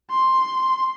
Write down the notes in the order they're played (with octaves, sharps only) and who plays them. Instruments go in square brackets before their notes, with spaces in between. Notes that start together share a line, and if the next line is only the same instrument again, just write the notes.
[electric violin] C6